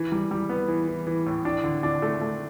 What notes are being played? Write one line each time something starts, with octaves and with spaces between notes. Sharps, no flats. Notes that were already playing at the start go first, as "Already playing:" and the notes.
Already playing: E3
G3
G3
B3
E3
E3
E3
A2
D4
D3
D4
A3
A3